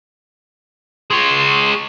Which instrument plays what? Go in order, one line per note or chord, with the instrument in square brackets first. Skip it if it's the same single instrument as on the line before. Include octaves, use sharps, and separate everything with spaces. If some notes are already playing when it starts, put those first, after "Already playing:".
[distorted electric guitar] G#3 C#5 [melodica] C6